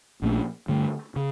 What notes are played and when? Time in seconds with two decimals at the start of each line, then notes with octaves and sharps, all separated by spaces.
0.22 A#1 A#2 A3 D4
0.68 G2 D3 A3
1.16 C#3